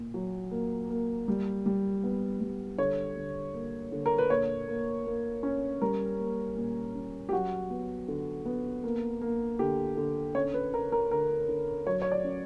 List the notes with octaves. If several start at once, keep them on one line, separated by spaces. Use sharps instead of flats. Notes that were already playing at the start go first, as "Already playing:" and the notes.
Already playing: A#2
F#3
A#3
A#3
G3
G3
B3
G3
D3 C#5
D3
A#3
D3
A#4
B4
A#2 C#5
A#3
A#3
C#4
G3 A#4
A#3
A#2
C#4
G4
F#3 F#4
B3
D3
B3
A#3
A#3
D3 G4
D3
C#4 C#5
B4
D3 A#4
A#4
D3 A#4
D3
F#3 C#5
C#5
D5
C#4